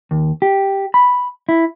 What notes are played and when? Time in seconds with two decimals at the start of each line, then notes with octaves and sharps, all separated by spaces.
0.11 D#2
0.42 G4
0.94 B5
1.49 E4